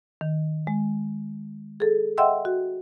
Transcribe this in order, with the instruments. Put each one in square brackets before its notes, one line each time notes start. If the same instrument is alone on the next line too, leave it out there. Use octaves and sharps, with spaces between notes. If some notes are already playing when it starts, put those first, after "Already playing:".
[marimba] D#3
G#3
G#4 A4
D#5 E5 F#5 G5 C6 E6
F#4